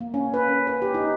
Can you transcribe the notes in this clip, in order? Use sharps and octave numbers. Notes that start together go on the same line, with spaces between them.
A#3
C#4
B4
C#4
B4
G4
D#4